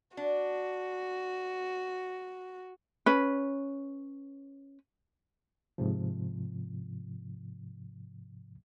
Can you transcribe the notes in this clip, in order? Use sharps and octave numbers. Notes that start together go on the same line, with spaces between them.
D4 F#4
C#4 B4
G#2 C3 F3